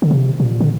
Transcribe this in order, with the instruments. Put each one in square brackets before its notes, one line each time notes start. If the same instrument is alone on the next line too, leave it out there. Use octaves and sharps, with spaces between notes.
[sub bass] D3
C3
A#2
D3